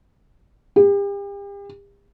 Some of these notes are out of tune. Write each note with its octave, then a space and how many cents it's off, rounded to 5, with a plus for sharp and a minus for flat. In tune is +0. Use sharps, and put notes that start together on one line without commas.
G4 +40